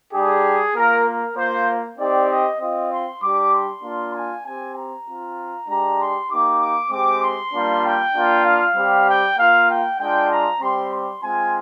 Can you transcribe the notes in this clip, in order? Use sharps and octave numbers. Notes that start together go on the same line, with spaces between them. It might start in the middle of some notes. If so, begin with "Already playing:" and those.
G3 D4 G4 G#4
A#3 F4 A#4
A#4
A#3 F4 C5
C4 D#4 G4 D5
D#5
C4 F4 D#5
C6
G3 D4 G4 D6
C6
A#3 D4 F4
G#5
C4 G4 G#5
A#5
C4 F4
G#3 D4 G4 A#5
C6
A#3 D#4 G4 D6
D6
G#3 C4 G4 D6
C6
G3 A#3 D4 F4
G5
A#3 D4 F4
F5
G3 C4 G4
G5
A#3 F4 F5
G5
G#3 D4 F4 G5
A#5
G3 C4 G4 C6
C6
G#3 C4 F4 G#5